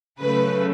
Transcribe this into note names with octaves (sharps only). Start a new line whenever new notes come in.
C#3 F#3 A3 B4